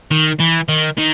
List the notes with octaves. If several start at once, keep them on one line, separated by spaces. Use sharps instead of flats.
D#3
E3
D#3
D#3